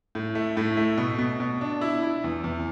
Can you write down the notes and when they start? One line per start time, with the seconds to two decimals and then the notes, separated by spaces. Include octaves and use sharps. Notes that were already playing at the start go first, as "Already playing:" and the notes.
0.15 A2
0.35 A3
0.57 A2
0.77 A3
0.98 B2
1.18 B2
1.40 B2
1.61 D4
1.81 E4
2.03 E4
2.24 E2
2.44 E2